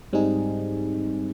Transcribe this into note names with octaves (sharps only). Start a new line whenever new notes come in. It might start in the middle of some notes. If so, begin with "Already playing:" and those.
G#2 G3 C4 D#4 G#4